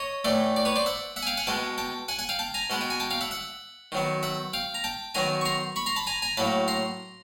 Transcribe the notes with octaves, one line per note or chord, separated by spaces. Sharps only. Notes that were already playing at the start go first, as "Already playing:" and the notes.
Already playing: C#5 D#5
A2 E3 A3 D5 E5
D5
B4 C#5
C5 D5
E5 F#5
E5 F#5
G#5
F5 G5
F#5 G#5
B2 G#3 B3 G5 A5
G5 A5
F#5 G#5
F#5 G#5
F5 G5
G5 A5
G#5 A#5
B2 G#3 B3 F#5
G5
G#5
G5 A5
F5 G5
E5 F#5
E5 F#5
D#3 F#3 B3
E5 F#5
F5 G5
A#5
G5 A5
D#3 F#3 B3 G#5 A#5
C#6
A#5 C6
B5 C#6
A#5 C6
A5 B5
G#5 A#5
G#5 A#5
A2 F#3 A#3 A5 B5
A#5 C6